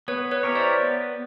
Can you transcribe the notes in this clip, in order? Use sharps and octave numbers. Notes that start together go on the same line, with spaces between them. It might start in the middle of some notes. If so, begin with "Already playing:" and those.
B3 B4 C#5
B4 C#5
E4 G4 A#4 C#5
C5 D5
B3